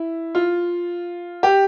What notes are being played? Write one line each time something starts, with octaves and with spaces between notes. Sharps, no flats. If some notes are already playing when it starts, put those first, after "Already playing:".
Already playing: E4
F4
G4